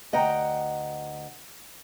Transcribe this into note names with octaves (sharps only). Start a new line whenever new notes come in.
D2 D#5 F#5 G5 A#5